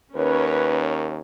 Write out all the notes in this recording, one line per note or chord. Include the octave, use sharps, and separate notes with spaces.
D#2 C#4 A#4 B4 C#5